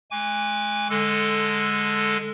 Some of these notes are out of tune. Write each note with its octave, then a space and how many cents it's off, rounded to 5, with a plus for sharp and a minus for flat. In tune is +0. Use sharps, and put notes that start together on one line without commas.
G#3 +35 G#5 -25 D6 -35
D3 +0 G#3 +0 A4 +0